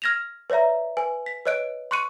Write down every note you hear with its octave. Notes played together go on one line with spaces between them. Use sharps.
F6 G#6 A#6 E7 F7
B4 C#5 D5 E5 A#5
B4 G#5
B6
B4 C#5 D#5 F#6 D7
C6 C#6 F#6 C#7 D#7